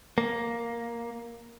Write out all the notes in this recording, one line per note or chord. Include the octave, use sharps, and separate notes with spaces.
A#3